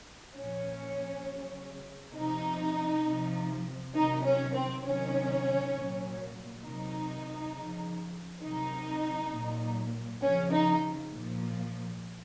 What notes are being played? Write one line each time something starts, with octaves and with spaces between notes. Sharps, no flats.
A#2 F3 C#4
C#3 F#3
C3 F3 D#4
C3 F3
C3 D#3 F#3 D#4
C#4
C4
C3 D#3 F#3 C#4
A#2 F#3
C3 D#3 F#3 D#4
C#3 F3
C3 D#3 F#3 D#4
A#2 F#3
C#3 F3 C#4
D#4
A#2 F3